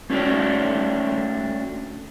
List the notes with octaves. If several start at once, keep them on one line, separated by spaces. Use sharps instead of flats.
A3 C#4 D4 F#4 C#5 G5